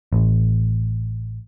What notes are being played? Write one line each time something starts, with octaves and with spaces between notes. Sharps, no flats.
A1